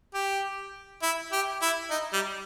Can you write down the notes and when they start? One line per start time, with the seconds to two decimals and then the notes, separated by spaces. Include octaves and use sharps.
0.14 G4
1.02 E4
1.32 G4
1.62 E4
1.91 D#4
2.13 G3